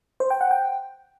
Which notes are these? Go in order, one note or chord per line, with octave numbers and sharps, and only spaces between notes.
C5
G5
F#5
G5